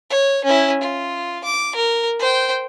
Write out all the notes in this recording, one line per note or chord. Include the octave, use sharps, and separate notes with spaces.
C#5
C#4 E4
F4
D6
A#4
C5 G5